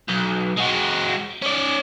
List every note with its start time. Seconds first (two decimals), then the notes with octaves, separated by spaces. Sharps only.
0.09 B1
0.57 G#3 F#4
1.42 C#4 D5